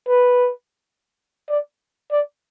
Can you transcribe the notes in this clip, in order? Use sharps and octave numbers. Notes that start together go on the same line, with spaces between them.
B4
D5
D5